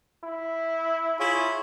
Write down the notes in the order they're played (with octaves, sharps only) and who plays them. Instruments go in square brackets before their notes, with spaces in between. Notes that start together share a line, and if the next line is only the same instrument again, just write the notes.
[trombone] E4
[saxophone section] E4 F4 G#4 [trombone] C#5